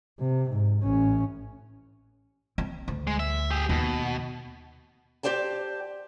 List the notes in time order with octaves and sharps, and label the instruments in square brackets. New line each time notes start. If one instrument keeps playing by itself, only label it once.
[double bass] C3
G#2
A1 C#4
[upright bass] C4
D2
[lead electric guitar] G#3
E5
G4 G#4
[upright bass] D#2 [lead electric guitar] B2
[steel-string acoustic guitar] G4 C5 D5 G5 A5